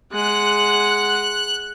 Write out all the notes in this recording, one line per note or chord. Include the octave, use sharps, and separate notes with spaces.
G#3 F#5 F#6